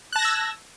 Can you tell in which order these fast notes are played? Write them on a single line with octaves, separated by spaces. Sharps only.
F#6 A5 A#6 G#6 E6